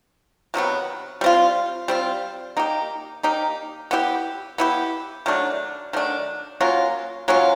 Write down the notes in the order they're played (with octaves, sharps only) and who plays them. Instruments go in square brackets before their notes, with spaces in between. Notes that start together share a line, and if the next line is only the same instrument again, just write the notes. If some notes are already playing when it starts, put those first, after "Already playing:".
[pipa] C3 D#3 F#3 B3
G3 C4 F4
G3 C4 F4
A#3 D#4 G4
A#3 D#4 G4
B3 E4 G4
B3 E4 G4
D#3 F#3 A3 D4
D#3 F#3 A3 D4
F#3 A#3 C#4 F4
F#3 A#3 C#4 F4